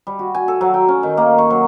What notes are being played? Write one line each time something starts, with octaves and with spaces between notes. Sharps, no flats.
G3
F#4
G#5
A4
F#3
G5
C#4
D#3
A#3
C#6
F#3